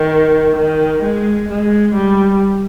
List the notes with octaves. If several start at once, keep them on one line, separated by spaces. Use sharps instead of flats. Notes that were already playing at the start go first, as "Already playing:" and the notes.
Already playing: D#3
D#3
G#3
G#3
G3